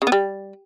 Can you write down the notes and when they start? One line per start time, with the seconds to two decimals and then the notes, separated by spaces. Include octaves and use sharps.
0.02 C#3
0.07 B3
0.12 G3